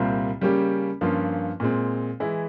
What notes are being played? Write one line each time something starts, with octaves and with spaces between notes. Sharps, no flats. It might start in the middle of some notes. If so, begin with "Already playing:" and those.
Already playing: C2 A#2 G3 C4 F4
C#3 G3 A#3 C#4 G4
G2 F3 A#3 C#4 F4
A#2 G#3 C4
E3 G#3 E4